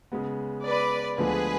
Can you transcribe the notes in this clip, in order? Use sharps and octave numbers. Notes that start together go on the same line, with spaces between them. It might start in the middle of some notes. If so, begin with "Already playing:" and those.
C#3 G#3 B3
B4 D5
D2 D3 F3 G#3 B3 G#4 B4